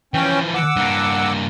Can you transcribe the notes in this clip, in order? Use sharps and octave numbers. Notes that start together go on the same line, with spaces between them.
E3 F3 C#4 G5
F#5 D6 E6
G2 A#3